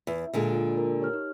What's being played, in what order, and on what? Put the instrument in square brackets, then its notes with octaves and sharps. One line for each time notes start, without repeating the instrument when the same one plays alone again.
[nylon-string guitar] E2
A#2 D3 G#3
[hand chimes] F4
A#4
G4 C#5 F6
D#4